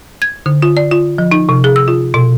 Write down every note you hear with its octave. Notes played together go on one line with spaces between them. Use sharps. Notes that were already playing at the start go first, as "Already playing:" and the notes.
G#6
D3
F4
D5
F4
F3
D#4
C3
G#4
E6
F4
B2